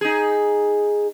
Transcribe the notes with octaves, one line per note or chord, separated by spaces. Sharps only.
D#4 G#4